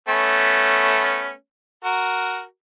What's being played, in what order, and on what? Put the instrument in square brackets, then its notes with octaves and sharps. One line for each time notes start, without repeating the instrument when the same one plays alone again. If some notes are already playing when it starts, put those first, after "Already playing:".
[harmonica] A3 B3 C#4
F#4 A#4